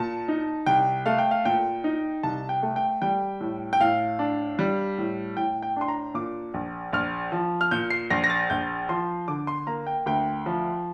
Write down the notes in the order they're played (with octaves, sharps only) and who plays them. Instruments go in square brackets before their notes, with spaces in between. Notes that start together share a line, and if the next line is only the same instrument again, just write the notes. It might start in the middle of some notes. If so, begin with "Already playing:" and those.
Already playing: [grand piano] A#2 A5
D#4
C2 G5
A3 F5
G5
F5
A#2 G5
D#4
C2 A5
G5
A3
G5
G3 G5
A2
G5
A2 F5
D4
G3
A2
A2 G5
G5
D4 C6
A#5
A#2 D6
A#1
A#1 F6
F3
F6
A#2 G6
C7
A#1 A#6
A#6
A6
A#1 G6
F3 C6
D3 D6
C6
A#3 A#5
G5
D2 G5
F3